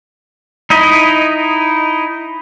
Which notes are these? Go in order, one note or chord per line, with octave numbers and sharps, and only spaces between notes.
D#4 E4 D#5